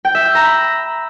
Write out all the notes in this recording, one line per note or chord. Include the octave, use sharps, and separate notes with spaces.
G5
E5
G6
A#5
B5